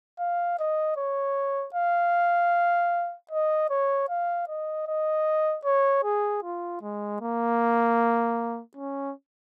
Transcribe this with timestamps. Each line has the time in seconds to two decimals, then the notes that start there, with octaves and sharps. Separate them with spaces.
0.19 F5
0.59 D#5
0.97 C#5
1.75 F5
3.31 D#5
3.70 C#5
4.09 F5
4.48 D#5
4.87 D#5
5.65 C#5
6.04 G#4
6.44 F4
6.82 G#3
7.21 A#3
8.77 C#4